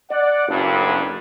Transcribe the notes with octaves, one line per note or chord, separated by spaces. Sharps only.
D5 F#5
F#1 B1 G2